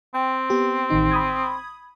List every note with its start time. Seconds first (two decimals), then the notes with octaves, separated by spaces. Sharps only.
0.14 C4 G5
0.50 B3 G4
0.90 A1 D#3 D#4
1.11 B5 D#6 G#6